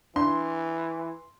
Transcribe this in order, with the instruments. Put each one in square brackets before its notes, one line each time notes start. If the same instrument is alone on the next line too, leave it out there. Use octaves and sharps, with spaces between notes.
[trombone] E3 [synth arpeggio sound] D4 [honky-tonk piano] C6